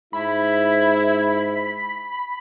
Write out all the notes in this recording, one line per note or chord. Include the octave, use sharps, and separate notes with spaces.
G#2 E4 B5